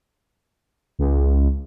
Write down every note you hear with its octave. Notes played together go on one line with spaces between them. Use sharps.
C#2